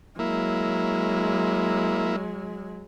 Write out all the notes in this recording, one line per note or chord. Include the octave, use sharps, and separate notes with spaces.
F#3 G#3 A#3 E4